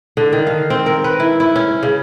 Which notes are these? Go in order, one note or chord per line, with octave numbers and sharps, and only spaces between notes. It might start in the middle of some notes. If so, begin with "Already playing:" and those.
D3
D#3
F5
C4
A#4
B4
E4
E4
C#4
C#3